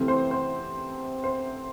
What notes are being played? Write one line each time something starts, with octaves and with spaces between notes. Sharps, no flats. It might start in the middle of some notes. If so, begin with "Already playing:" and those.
Already playing: C3 E3 A3 C4
C5
C5
C5